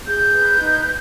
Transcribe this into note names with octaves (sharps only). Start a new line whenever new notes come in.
G#4 G6
B4
D#4